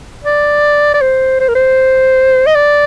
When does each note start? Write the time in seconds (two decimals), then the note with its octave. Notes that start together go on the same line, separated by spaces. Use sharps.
0.24 D5
0.94 D5
1.01 C5
1.40 C5
1.48 A#4
1.55 C5
2.46 D#5
2.55 D5